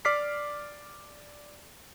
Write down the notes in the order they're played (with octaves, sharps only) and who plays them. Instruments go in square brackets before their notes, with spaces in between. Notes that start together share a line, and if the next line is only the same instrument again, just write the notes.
[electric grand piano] D5 D6 F6 B6 C7